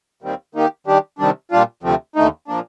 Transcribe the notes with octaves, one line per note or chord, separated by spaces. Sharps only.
D#2 D#3 G3 C4
D#3 A#3 D#4 G4
D#3 G3 D4 G4
C3 D#3 G3 D4
A#2 G3 D4 F4
D2 C3 F3 A3 C4
D#2 D3 A3 D#4
A#2 F3 A#3 D4